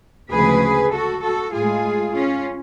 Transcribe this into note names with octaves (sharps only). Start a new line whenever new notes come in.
D2 C#3 F3 G#3 G#4 B4
F#4 A4
F#4 A4
A2 G#3 F4 G#4
C#4 F4